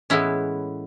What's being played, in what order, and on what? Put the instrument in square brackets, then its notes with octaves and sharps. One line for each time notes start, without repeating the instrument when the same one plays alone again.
[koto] A2 E3 G#3 B3 C#4 E4